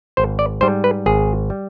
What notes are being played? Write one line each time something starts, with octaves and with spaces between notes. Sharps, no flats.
G#1 C5
D5
G#2 G3 C5
B4
G#1 G#4
G3